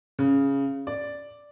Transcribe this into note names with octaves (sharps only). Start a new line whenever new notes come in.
C#3
D5